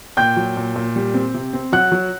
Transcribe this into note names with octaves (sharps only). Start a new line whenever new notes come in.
A#2 G5 G6
F#3
A#2
A#2
G3
C4
C3
C4
F#3 F#5 F#6
F#3